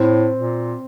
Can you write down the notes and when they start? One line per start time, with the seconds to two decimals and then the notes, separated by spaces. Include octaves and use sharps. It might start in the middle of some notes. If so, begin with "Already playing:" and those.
Already playing: A2 C4
0.34 A#2